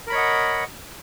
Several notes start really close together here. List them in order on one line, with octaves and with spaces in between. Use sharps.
A#4 B5 C#5 D#5 F#5